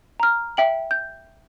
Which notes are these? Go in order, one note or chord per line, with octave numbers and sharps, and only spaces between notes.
A#5 F6
E5 G5 F#7
G6